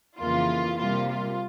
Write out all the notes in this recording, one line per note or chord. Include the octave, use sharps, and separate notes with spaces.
F2 C#3 E3 A#3 F4
C3 G3 A#3 F4
F4